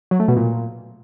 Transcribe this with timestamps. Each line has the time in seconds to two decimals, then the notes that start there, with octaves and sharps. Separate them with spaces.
0.11 F#3
0.20 A3
0.28 B2
0.37 A#2